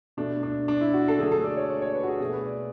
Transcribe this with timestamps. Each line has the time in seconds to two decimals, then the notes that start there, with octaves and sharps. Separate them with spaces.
0.17 B2 A3 D4
0.43 D4
0.68 D4
0.81 E4
0.94 F#4
1.08 A4
1.19 D3 F#3 A3 G#4
1.32 A4
1.44 D5
1.57 C#5
1.70 D5
1.82 C#5
1.95 B4
2.04 F#4
2.08 G#4
2.20 B2 A3 G#4
2.33 B4
2.46 D5